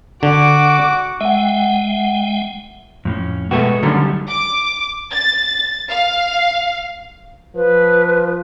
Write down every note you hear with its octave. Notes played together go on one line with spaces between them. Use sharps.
D3 F#4 D6
G#3 E5 F#5 G5
F2 A2 C#4
B2 G#3 A3 B3 F#4
F#2 D3 D#3 F#3 G3
D6
A6
F5
F3 B4